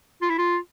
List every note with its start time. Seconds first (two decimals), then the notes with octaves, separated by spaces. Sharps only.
0.22 F4
0.30 E4
0.38 F4